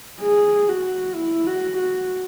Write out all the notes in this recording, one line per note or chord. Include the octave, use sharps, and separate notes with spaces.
G#4
F#4
E4
F#4
F#4